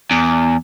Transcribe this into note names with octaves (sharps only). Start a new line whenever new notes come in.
E2